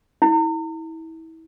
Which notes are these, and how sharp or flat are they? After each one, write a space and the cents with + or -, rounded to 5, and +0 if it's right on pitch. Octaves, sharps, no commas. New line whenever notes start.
E4 -30